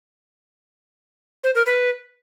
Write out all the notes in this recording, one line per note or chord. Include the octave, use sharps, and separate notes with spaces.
C5
A#4
B4